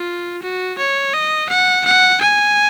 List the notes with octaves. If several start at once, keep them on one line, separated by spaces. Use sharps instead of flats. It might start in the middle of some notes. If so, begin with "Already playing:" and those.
Already playing: F4
F#4
C#5
D#5
F#5
F#5
G#5